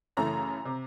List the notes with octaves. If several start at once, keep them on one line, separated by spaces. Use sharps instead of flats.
F#2 C#3 E3 A3 A#5
C3